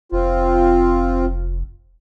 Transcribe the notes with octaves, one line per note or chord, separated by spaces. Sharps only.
F1 C4 F4